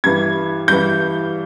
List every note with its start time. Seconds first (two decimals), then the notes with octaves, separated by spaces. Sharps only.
0.04 G2 E3 G#6
0.68 G2 E3 G6